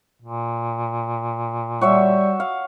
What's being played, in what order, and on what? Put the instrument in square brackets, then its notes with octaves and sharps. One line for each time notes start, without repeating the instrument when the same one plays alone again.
[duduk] A#2
[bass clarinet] G3 [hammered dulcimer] F#4 C#5 E5
[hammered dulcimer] F5